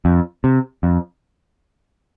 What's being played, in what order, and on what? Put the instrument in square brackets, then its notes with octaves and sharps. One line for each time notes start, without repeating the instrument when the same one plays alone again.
[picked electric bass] F2
C3
F2